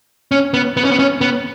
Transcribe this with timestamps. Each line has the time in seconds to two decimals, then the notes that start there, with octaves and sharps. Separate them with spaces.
0.31 C#4
0.54 B3
0.77 B3
0.84 C#4
0.91 B3
0.99 C#4
1.21 B3